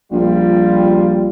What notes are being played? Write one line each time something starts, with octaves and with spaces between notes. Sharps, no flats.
A#1 G3 F4